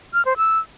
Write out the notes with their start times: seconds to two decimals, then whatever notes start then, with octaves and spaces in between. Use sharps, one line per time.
0.14 F6
0.25 C5
0.37 E6